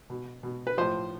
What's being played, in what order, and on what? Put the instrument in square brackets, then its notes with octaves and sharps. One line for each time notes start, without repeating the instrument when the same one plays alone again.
[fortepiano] B2
B2
B4
A2 F3 C5